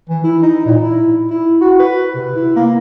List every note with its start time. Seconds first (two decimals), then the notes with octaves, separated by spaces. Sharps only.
0.10 E3
0.24 E4
0.43 D#4
0.66 A#2
0.81 E4
1.31 E4
1.61 F#4
1.79 B4
2.15 C3
2.36 E4
2.56 A#3